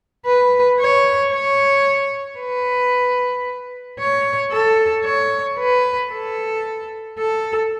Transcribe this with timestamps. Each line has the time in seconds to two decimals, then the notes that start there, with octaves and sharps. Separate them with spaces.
0.26 B4
0.80 C#5
1.33 C#5
2.40 B4
4.00 C#5
4.52 A4
5.05 C#5
5.59 B4
6.12 A4
7.19 A4